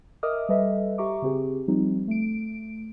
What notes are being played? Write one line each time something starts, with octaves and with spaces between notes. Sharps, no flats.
A#4 D#5 E5 D6 D#6 F6
G3 A4 B4 D#5 E5
G4 E5 A#5 C#6 D6
C#3 C4 G4 G#4
F3 G3 C4 D#4
A3 D7